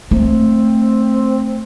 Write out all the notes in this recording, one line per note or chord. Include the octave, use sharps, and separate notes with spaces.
A3 C4